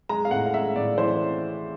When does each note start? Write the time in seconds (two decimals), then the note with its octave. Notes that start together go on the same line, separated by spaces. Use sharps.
0.09 G#3 A#5
0.25 F5
0.31 A2 F#5
0.46 F5
0.53 G#3 E5
0.75 A2 D5
0.98 E3 C5